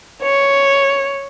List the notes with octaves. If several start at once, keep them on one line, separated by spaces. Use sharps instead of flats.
C#5